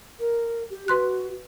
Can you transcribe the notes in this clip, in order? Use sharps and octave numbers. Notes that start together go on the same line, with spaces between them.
A#4
G4
F#4 B4 C6 F#6